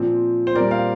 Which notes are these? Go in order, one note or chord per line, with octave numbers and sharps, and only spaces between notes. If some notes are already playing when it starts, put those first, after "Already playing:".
Already playing: A#2 F3 C4
C5
A#2 G3 C4 A#4 D5
C5 F5